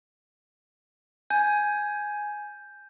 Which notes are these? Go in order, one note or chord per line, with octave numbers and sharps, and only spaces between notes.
G#5 G6